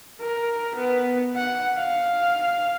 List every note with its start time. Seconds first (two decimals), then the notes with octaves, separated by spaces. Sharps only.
0.21 A#4
0.76 B3
1.36 F#5
1.78 F5